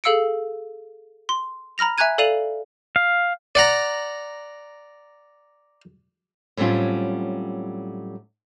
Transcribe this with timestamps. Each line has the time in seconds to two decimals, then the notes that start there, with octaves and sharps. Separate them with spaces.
0.04 G#4 A4 F5 E6 C#7 D7
1.29 C6
1.78 A#5 B5 F6 A#6 F7
1.98 E5 G#5 A#5 F#6 G#6 D#7
2.18 A4 D5 F5 D#7 F7 F#7
2.96 F5
3.55 D5 F#5 A#5
6.57 A2 F#3 G3 C4 C#4 F4